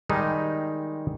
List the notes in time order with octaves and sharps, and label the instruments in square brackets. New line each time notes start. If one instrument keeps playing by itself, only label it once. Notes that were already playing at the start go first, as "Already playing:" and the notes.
[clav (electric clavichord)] D#3 G3 G#3 D#4